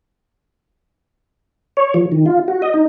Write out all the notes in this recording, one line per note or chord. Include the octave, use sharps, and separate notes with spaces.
C#5
F3
D#3
F4
F#4
D#5
D#4